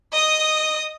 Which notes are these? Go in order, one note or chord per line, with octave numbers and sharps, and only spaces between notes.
D#5 D#6